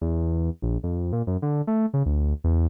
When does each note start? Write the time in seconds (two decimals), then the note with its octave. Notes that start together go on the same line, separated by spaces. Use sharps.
0.01 E2
0.62 A#1
0.83 F2
1.13 A#2
1.27 F#2
1.42 D3
1.67 A3
1.94 C#3
2.06 D2
2.44 E2